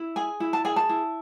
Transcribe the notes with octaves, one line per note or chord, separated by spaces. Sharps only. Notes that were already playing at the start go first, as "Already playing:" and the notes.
Already playing: E4
G#4 G#5
E4
A5
G#4 G#5
A5
E4